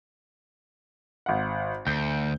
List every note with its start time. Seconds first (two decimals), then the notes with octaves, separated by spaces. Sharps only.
1.26 G#1 F#5
1.87 D2 G6